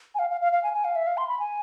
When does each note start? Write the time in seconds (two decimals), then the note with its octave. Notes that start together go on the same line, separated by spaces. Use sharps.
0.15 G#5
0.19 F5
0.30 F5
0.41 F5
0.52 F5
0.63 G#5
0.73 G#5
0.85 F5
0.96 E5
1.07 F5
1.17 C6
1.28 B5
1.39 G#5